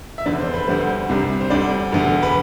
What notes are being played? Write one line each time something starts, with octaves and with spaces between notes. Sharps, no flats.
E5
F1 E2 D3 D5
C5
B4
D2 D3 G3 C5
C2 C3 G3
C5
D2 D3 G3 D5
E1 D2 D3
B4